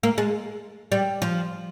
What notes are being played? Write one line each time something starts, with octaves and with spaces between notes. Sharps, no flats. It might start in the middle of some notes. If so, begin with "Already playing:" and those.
A#3
G#3
G3
F3